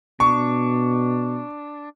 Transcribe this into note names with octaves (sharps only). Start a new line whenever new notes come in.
B2 D4 C#6